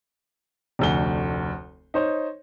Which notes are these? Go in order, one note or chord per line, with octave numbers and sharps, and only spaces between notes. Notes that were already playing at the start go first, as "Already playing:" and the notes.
F1 D2 G7
D#4 C5 C#5